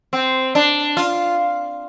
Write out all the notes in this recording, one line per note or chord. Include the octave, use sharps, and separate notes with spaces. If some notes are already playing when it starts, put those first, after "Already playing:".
C4
D4
F4